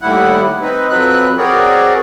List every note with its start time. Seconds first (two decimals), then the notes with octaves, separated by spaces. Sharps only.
0.01 D#2 A2 G3 E4 F#5
0.62 C4 D#4 B4
0.90 F2 F#3 C4 B4 F#6
1.38 C4 F#4 G#4 A#4 C#5 D5